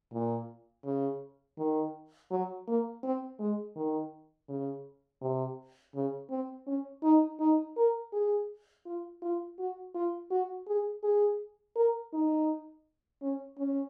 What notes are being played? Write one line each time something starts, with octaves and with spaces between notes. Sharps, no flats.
A#2
C#3
D#3
F#3
A#3
C4
G#3
D#3
C#3
C3
C#3
C4
C#4
D#4
D#4
A#4
G#4
F4
F4
F#4
F4
F#4
G#4
G#4
A#4
D#4
C#4
C#4